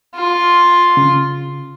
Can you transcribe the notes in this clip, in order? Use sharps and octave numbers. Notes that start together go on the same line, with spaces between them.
F4
C#3